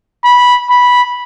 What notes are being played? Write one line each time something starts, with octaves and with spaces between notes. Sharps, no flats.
B5
B5